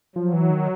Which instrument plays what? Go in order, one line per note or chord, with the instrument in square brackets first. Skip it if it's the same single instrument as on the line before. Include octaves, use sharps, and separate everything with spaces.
[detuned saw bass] F3 [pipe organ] F#3
[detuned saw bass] E3
D#3